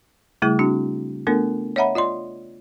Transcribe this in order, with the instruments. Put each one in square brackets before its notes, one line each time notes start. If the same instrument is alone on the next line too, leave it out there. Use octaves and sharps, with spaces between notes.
[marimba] C#3 G3 A3 E4 G#4
C4 D4 F#4
A3 B3 D4 F4 A4 A#4
C#5 D#5 E5 F#5 A#5 B5
F4 D5 D#5 C6